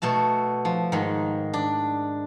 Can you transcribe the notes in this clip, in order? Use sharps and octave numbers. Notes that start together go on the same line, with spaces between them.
B2 A3 F#4 A5
F3
G#2 D#3
D4